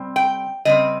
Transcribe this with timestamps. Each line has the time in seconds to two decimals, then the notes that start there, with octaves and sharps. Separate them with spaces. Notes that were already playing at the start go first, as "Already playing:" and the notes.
Already playing: C3 G3 C4
0.16 G5
0.65 C#3 G3 C4 D#5